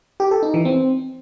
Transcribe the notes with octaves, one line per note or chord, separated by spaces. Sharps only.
G4
A4
D#4
E3
C4